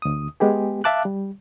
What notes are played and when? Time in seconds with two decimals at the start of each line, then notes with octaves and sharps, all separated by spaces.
0.02 D2 D#6
0.40 G#3 B3 G4 G#4
0.84 E5 F5 A5 D6 F#6
1.05 G3